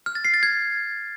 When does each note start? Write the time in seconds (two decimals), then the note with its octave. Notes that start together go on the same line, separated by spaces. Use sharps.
0.06 F6
0.15 A6
0.25 C7
0.34 A6
0.43 G#6